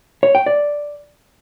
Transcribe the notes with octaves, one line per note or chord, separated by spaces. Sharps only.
C#5
G5
D5